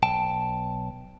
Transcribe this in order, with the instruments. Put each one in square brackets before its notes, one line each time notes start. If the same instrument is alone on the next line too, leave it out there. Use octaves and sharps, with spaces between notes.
[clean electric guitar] B1 G5 A5